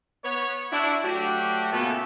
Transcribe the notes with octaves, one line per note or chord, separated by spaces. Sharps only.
B3 C#5
D4 E4 F#4
F#3 A3 D4 F#4 G4
A#2 C#3 A3 B3 E4 A4